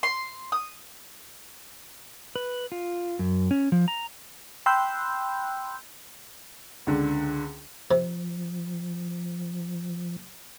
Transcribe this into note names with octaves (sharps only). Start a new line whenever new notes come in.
C6
D#6
B4
F4
F#2
C#4
F3
A#5
G5 B5 C6 E6 F#6 G6
C#2 D3
C3 F3